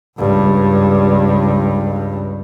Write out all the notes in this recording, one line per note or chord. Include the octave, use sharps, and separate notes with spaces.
C#2 G2